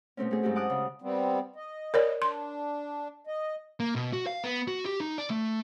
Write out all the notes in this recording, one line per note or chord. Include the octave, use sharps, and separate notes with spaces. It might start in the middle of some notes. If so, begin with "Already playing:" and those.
B2 A3 C4 C#4
A3 G#4
G#2 F#3 F#4 G4
F#5 A5 D6 D#6 F6 F#6
C#3
G3 B3 C4
D#5
A#4 C#5 D5
D4 C6
D#5
A#3
B2
F#4
F5
B3
F#4
G4
D#4
D5
A3